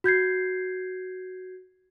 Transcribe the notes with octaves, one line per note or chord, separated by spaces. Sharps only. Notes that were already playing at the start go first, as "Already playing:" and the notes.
F#4 G6 G#6 C7